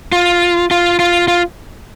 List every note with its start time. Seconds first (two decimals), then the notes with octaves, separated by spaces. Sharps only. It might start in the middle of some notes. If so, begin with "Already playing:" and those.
0.12 F4
0.71 F4
0.99 F4
1.28 F4